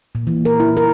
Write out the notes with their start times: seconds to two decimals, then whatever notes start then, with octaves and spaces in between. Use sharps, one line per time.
0.15 A#2
0.27 E3
0.45 A#4
0.60 E4
0.77 A#4